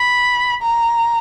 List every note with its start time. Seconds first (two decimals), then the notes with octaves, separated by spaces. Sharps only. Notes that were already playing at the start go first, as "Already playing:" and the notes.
Already playing: B5
0.62 A#5